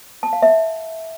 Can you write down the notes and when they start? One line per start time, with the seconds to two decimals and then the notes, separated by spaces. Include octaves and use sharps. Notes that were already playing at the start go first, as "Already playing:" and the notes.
0.23 A5
0.33 F5
0.42 E5